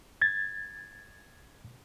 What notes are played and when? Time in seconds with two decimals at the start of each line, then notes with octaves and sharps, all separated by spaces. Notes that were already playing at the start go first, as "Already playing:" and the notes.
0.22 G#6 A6